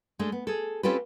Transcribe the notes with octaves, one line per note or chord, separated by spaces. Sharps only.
G#3 A3 D4
B3
G#4 A4
C4 C#4 F4 G4 A4 B4